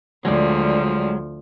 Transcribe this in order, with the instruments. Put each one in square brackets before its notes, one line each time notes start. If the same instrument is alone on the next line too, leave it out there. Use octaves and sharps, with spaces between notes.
[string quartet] D2 F3 [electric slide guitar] F#3 G#3 D5